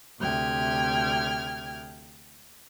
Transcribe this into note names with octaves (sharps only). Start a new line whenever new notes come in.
D2 C3 G5 F6 G#6